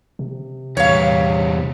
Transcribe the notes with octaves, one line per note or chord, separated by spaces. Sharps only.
C3
E2 G3 C#5 F5